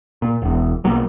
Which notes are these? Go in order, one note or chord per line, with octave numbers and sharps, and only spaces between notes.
A#2
E1 E2
B1 F#3 A#3